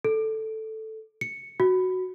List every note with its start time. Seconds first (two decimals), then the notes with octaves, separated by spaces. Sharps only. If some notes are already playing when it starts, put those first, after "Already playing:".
0.04 A4
1.21 C#7
1.60 F#4